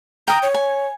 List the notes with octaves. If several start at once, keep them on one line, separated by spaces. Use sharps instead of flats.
G5 A#5 D#6
C#5
G#5